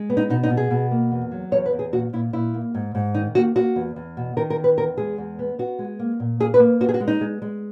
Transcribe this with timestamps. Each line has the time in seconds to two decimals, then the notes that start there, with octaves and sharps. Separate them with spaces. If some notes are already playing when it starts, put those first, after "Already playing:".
Already playing: G#3
0.10 B3
0.17 D#4
0.30 B2 D#4
0.44 D#4
0.50 B2
0.57 G#4
0.71 B2
0.91 A#3
1.12 E2
1.31 F#3
1.52 E2 C#5
1.66 B4
1.73 E2
1.79 G#4
1.92 A#2 F#4
2.13 A#2 E4
2.33 A#2 E4
2.54 A#3
2.75 G#2
2.95 G#2
3.14 D#3 D#4
3.35 A#3 F#4
3.55 A#3 F#4
3.76 E2
3.96 E2
4.17 B2
4.37 D#3 A#4
4.50 A#4
4.57 E2
4.64 B4
4.77 E2 A#4
4.97 G#3 G#4
5.18 E2
5.39 B3
5.59 B3 F#4
5.79 G#3
5.99 A#3
6.20 A#2
6.40 A#3 G#4
6.54 B4
6.60 A#3
6.81 B3 F#4
6.89 G#4
6.94 F#4
7.00 G#3
7.08 D#4
7.21 G#3
7.42 G#3